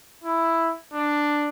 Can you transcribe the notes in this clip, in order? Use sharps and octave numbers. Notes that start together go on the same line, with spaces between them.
E4
D4